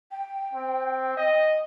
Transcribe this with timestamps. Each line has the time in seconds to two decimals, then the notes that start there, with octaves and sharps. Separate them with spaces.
0.11 G5
0.53 C4
1.17 D#5